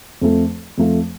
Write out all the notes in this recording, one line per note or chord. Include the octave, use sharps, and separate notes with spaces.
F2 F3 A3
F2 F3 A3